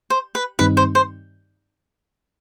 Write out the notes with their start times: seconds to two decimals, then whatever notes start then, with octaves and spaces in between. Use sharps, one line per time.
0.10 C5
0.35 B4
0.59 G2 D#3 G3 C4 D#4 B4
0.77 C5
0.95 C5